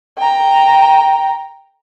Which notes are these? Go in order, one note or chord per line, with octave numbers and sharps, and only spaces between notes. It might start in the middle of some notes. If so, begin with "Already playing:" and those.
G5 A#5